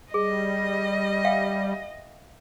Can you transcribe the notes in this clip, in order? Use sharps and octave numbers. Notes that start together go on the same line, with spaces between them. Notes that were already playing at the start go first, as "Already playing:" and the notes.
G3 G#4 D#5
E5 F5 G5